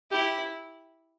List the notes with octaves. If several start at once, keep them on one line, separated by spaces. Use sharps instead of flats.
E4 G4